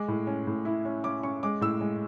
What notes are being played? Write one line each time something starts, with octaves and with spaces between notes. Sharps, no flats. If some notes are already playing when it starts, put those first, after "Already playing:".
Already playing: G#3 D6
A2
C#4
A2
E4
C#4
C#4 D6
C#4 C#6
G#3 D6
A2 E6
G#3